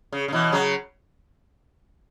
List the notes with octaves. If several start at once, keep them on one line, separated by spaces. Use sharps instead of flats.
C#3
C#3
B2 E3
C#3 F#3